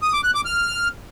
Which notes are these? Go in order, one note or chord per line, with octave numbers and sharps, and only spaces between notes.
D#6
D6
F#6
D6
F6